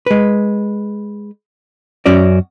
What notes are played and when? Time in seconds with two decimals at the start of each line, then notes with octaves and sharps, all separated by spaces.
0.06 G#3 B4
2.06 F#2 C#4 F#4 D5